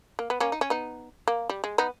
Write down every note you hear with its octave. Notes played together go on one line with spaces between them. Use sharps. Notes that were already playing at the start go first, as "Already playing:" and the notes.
A#3
B3
A#3 C#4
D#4
C#4
B3 D#4
A#3
G3
G#3
B3 D#4